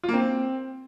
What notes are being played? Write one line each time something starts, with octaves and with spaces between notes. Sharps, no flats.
F4
A#3
C4